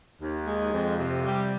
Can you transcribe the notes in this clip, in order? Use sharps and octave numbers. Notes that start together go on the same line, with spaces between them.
D#2
G#3
F2
C3
G3